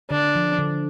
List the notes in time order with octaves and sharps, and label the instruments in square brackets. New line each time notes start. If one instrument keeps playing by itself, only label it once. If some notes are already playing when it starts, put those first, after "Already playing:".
[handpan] D3 [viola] D4
[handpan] F3
D3